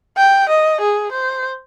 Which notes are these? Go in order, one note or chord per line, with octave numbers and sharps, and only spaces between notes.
G5
D#5
G#4
C5